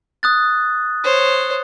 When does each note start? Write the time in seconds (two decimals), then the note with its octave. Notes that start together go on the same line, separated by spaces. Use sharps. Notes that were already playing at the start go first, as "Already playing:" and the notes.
0.23 D#6 F#6 A6
1.04 C5 C#5